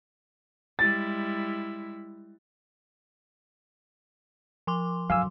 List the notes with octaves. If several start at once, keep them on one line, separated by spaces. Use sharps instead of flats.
G3 G#3 E4 A6
F3 C6 D6
D3 F#3 F5 G#5 E6